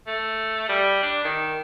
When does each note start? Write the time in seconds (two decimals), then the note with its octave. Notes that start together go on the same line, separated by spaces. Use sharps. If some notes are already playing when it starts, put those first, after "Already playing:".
0.07 A3
0.69 G3
1.02 D4
1.25 D#3